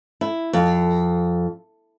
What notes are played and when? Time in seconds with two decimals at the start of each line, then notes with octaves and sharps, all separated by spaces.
0.21 E4
0.53 F2